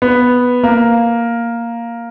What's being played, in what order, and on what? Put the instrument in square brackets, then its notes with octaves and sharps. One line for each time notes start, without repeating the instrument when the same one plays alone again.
[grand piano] B3
A#3